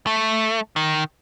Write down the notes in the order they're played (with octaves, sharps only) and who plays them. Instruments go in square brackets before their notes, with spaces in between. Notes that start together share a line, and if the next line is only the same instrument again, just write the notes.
[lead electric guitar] A3
D#3